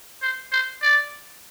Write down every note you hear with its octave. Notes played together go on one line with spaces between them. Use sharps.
C5
C5
D5